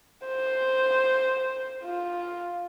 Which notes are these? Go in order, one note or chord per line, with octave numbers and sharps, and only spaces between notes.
C5
F4